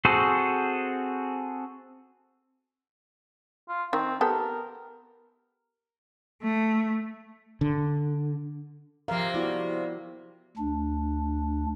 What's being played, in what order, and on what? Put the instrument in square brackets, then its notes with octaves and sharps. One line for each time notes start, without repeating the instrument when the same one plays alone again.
[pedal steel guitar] C4 F#4 G#4 A4 C5
[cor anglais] F4
[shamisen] D#3 [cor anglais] C4
[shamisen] B3 G4 A4 [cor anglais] A#4
[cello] A3
[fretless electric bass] D3
[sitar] C3 A#3 [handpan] F3 F5 [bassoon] A#4
[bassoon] G3 [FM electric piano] B3 E4 [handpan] F#4
[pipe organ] D2 D4